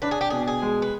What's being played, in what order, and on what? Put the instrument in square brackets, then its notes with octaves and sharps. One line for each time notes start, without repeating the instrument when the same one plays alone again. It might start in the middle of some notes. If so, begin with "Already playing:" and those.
[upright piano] D4 [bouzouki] B4
[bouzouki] G#4
G4
[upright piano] B2 [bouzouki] G#4
[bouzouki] G#4
[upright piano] G#3
[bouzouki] B4